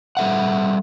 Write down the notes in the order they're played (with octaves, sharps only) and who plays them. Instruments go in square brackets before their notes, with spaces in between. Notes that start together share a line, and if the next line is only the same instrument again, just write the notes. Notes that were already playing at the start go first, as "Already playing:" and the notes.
[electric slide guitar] G3 A4 E5 F#5